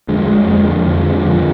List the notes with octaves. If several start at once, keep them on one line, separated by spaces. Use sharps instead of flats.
F2 D3 G#3
G#3
F2 D3 G#3
F2 D3
F2 D3 F3